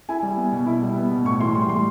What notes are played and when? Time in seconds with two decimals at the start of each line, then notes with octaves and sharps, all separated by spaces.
0.09 E4 G#5
0.23 G3
0.37 B3
0.52 B2
0.66 E4
0.82 G3
0.97 B3
1.11 B2
1.25 A2 C#6
1.39 E3 C6
1.55 G3 C6
1.69 A2 C6